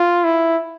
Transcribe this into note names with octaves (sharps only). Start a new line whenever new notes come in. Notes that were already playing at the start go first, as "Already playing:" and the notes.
Already playing: F4
E4